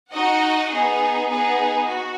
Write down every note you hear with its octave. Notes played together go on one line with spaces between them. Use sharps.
D#4 F#4 D#5 F#5
B3 D#4 G#4
B3 D#4 G#4
F#4